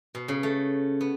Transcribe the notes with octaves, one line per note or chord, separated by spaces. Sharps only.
B2
C#3
A3
B3